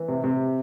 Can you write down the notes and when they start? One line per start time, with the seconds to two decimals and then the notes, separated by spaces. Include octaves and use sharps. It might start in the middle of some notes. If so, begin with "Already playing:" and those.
Already playing: E3
0.08 C3
0.24 C3